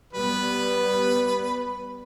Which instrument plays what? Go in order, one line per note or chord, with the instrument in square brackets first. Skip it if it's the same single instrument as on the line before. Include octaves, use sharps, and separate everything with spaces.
[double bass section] G3 B3 [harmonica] B4